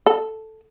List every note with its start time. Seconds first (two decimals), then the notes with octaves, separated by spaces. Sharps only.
0.06 A4